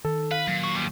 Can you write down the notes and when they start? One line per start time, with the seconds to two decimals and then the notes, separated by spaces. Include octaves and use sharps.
0.05 D#3 A4
0.31 B4 F5
0.48 A#2 F#3
0.64 F#4
0.75 D#2 G3